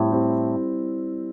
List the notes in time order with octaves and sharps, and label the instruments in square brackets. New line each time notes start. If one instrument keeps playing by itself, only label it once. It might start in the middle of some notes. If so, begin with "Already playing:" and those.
Already playing: [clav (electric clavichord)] A2 [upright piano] G3 C4 E4
[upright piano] G3 C4 E4